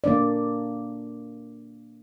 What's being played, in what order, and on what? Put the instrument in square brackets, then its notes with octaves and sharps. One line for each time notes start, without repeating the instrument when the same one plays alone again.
[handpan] A#3 D4 D5